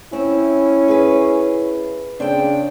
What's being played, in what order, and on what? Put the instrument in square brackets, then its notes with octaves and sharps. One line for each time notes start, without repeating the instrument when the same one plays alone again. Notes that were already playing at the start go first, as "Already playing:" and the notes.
[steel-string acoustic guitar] C4 [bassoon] C#4 [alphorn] E4
[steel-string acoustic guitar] G#4 B4
[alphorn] C#3 [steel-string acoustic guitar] C4 G5 [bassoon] D4